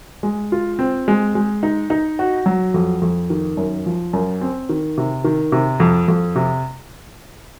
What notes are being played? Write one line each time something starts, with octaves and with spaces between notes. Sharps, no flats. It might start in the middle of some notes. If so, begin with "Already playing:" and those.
G#3
F4
C4
G#3
G#3
D#4
D#4
F#4
F#3
F2
F2
D#3
F#2
F3
F#2
C4
D#3
C3
D#3
C3
F2
F2
C3